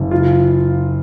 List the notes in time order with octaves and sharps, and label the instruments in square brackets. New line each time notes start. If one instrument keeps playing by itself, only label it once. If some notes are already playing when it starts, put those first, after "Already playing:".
Already playing: [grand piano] F#1
F4